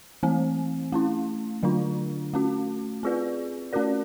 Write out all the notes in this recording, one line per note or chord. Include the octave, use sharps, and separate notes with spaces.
E3 A3 C4
A3 C#4 E4
D3 F#3 A3 D4 F4
A3 C#4 F#4
C4 F4 G#4 B4 D5
A3 C#4 F#4 A#4 D5